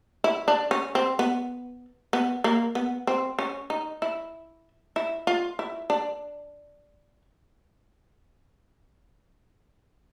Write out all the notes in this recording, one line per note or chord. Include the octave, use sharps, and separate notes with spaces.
E4
D4
C#4
C4
B3
B3
A#3
B3
C4
C#4
D#4
E4
E4
F4
E4
D4